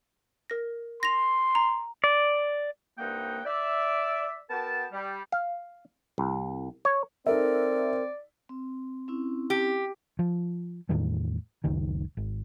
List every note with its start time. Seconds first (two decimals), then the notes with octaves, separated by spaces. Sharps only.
0.50 A#4 A#6
1.03 C6 A#6 F7
1.55 A#5
2.04 D5
2.98 C2 G2 A#3 D#4 F#5 G5
3.45 D5 E5
4.50 B3 F#4 A#4 G5 A5
4.92 G3
5.32 F5
6.18 C2
6.85 C#5
7.26 C4 D#4 A4 A#4 D5 E5
8.49 C4
9.08 C4 C#4 E4
9.50 G4
10.19 F3
10.89 E2 A2 D#3 G3
11.64 F#1 C#2 D#3
12.17 G#1